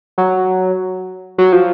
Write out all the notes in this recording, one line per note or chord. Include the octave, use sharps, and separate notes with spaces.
F#3
F#3
F3